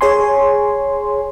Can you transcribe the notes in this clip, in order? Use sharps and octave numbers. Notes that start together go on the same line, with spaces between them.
G#4 C#5 G#5 C6